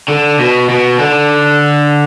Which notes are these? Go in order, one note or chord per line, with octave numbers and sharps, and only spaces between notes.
D3
B2
B2
D3